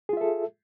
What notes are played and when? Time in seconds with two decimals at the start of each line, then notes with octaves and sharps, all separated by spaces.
0.09 G#4
0.13 F4
0.17 E5
0.21 A4